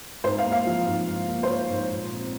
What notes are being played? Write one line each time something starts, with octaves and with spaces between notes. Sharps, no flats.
G#2 C5
F5
A#3
F5
F3
G#2
G#2
A#3
C5
F3 C#5
G#2
A#2
C4